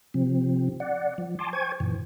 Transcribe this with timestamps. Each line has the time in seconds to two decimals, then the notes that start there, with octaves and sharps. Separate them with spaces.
0.14 C3 F3 C4
0.80 D5 F#5
1.18 F3
1.39 G#5 A5 C6 D6
1.53 C5 G5 G#5 C#6 G#6
1.80 F#2 A#2 E3